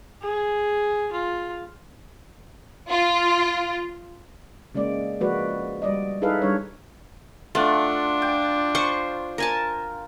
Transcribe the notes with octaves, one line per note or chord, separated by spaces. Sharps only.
G#4
F4
F4
C#3 G#3 A#3 D5
F3 G#3 A#3 F#4 B4 D5
G3 D5 D#5
D#4 E4 G#4 A4 B4 F5
G3 D4 C#5
A3 D4 F4 F#5
G5
C5 C6 C#6
A#4 G#5 A5